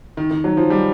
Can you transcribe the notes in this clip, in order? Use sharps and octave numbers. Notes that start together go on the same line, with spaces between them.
D#3
D#3
F#3
F3
G3